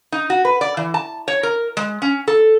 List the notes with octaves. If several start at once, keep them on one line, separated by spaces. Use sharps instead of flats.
D#4
F#4
B4
D5
E3
A5
C#5
A#4
G#3
C#4
A4